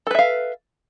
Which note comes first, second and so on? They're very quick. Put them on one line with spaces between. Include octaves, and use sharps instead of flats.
A4 B4 E5 F5